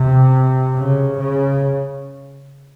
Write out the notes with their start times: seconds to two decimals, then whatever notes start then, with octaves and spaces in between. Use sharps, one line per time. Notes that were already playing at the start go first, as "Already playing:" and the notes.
Already playing: C3
0.77 C#3
1.20 C#3